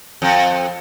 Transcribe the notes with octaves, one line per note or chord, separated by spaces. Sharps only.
F2